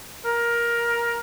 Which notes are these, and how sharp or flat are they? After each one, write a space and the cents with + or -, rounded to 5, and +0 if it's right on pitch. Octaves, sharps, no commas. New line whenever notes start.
A#4 +15